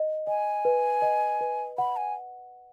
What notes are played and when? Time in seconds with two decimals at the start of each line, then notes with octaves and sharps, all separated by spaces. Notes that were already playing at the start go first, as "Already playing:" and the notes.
Already playing: D#5
0.27 D#5 G#5
0.65 B4
1.02 D#5
1.41 B4
1.78 F#5 B5
1.97 G#5